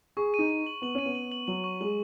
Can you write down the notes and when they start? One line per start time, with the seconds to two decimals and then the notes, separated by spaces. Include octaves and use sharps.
0.17 G#4 C#6
0.34 D#4 D#7
0.50 D#7
0.67 F#7
0.82 B3 F#7
0.95 C#4 D#7
1.06 B3
1.15 F#7
1.32 F#7
1.48 F#3 F#7
1.64 C#6
1.81 G#3 F#7